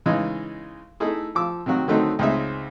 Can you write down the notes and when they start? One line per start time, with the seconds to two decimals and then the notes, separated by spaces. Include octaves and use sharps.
0.06 C#3 E3 G#3 D#4
1.00 A3 D#4 E4 G#4
1.35 F3 D6 E6
1.66 C3 D#3 F#3 F#4
1.88 D3 D#3 F#3 A3 C4 D#4
2.19 C#2 C4 D#4 G#4 E5